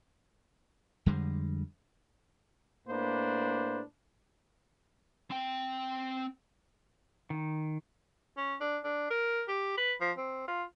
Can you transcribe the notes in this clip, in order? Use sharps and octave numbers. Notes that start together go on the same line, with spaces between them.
F2 D3 G3 G#3
A2 A#3 D4 B4 C5
C4 G5
D#3
C#4
D4
D4
A#4
G4
B4
F3
C4
F4